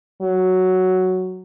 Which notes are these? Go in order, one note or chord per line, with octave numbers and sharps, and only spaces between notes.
F#3